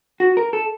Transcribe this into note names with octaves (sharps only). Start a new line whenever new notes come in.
F#4
A#4
A4